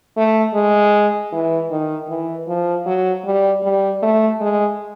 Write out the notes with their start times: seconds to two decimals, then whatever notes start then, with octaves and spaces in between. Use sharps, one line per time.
0.17 A3
0.54 G#3
1.32 E3
1.70 D#3
2.09 E3
2.48 F3
2.86 F#3
3.25 G3
3.63 G3
4.03 A3
4.41 G#3